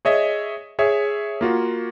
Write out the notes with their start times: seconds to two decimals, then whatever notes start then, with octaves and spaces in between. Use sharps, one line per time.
0.05 G#4 C#5 D#5 E5
0.79 G#4 C#5 E5
1.41 A#3 F4 F#4